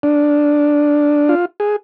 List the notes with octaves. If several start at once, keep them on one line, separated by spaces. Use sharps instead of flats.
D4
F4
G#4